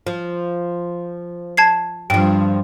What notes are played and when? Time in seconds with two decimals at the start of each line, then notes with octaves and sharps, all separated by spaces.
0.07 F3
1.57 A5 G#6 C7
2.10 G2 F3 G5